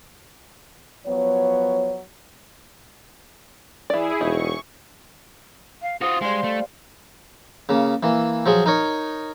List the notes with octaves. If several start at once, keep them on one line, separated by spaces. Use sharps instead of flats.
F3 F#3 B3 C#5
E3 E4 G#4 D5
E1 D#4 C#6
F5
F4 F#4 C5 C6 D#6
G3 G#3 F5 C6
A3
C#3 A#3
E3 A#3
F3 F#3 G#4
D#4 A#4 C#5